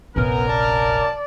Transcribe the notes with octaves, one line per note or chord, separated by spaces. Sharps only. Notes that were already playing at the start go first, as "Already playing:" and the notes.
F1 A#1 F#2 B3 A#4
D5 A5